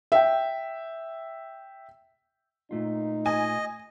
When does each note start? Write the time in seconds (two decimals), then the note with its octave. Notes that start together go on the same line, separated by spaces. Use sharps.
0.12 E5 G5
2.71 A#2 A3 D#4 F4
3.26 D#5 G#5